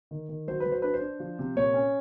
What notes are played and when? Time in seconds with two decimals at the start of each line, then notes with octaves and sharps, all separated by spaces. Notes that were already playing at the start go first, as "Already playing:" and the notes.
0.11 D#3
0.29 D#3
0.48 F#3 C5
0.60 B4
0.66 F#3
0.72 C5
0.82 D4 B4
0.94 C5
1.02 D4
1.20 F3
1.39 C3
1.56 A#2 C#5
1.74 C#4